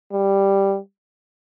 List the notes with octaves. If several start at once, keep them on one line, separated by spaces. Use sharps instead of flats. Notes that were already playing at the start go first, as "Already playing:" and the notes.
G3